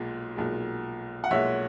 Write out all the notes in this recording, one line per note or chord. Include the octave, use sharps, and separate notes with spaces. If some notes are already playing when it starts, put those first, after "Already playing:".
Already playing: B1 A#2 G#3
B1 A#2 G#3
F#5
B1 A#2 G#3 C#5 E5